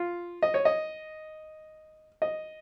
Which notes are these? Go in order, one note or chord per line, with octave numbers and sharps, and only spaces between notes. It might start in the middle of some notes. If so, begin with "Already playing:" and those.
Already playing: F4
D#5
C#5
D#5
D#5